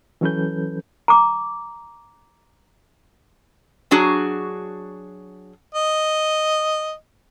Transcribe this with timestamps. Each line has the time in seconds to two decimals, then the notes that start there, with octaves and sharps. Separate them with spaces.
0.21 E3 F#3 C#4 A4 B4 G6
1.08 A#5 D6
3.91 F#3 D4 F#4 G#4
5.75 D#5